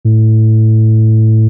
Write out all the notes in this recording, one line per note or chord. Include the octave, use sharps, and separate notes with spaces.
A2